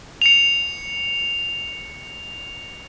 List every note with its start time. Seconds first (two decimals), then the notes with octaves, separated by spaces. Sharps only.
0.22 C#7 F7